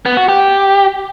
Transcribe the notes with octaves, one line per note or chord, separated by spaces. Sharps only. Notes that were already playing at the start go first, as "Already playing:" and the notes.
B3
F#4
G4